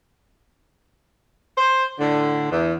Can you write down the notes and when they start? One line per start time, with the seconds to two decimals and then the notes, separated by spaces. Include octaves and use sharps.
1.58 C5
1.99 A2 D3
2.51 E2